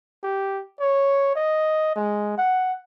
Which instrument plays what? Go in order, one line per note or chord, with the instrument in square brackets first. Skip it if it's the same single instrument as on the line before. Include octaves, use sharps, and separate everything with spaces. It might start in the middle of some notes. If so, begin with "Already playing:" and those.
[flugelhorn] G4
C#5
D#5
G#3
F#5